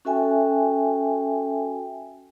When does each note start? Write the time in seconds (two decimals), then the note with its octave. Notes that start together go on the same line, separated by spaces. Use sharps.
0.05 C#4 F#4 A4 E5 G5 G#5